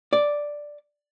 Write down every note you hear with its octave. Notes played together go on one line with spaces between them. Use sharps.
D5